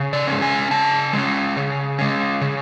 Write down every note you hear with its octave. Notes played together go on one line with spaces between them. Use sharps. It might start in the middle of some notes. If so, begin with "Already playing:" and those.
Already playing: C#3
D5
G#3 C#4
G#5
C#3 A5
G#3 C#4
C#3
G#3 C#4
C#3